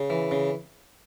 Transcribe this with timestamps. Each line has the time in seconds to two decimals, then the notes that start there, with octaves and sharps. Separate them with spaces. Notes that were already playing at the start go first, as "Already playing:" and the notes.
Already playing: C#3
0.10 E3
0.31 C#3